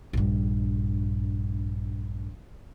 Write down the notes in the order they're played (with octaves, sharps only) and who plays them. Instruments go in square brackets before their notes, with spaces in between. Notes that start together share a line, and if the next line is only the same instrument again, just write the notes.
[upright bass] A#1 G2